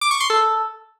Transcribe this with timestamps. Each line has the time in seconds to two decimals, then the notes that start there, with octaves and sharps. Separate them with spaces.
0.01 D6
0.11 C#6
0.20 C6
0.30 A4